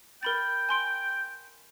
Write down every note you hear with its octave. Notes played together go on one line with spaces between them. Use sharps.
A#4 G5 B5 A6
G#5 C6 D7